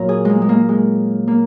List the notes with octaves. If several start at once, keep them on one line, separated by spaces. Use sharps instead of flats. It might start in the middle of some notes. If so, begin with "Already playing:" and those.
Already playing: A#2 F#3 A#4 C#5
G#4
G#3 A#3
G#3
A#3
G#3
A#3